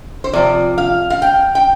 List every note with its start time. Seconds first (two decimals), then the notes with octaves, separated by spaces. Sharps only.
0.24 C5
0.33 C3 F3 D5
0.78 F5
1.10 F5
1.22 G5
1.55 G5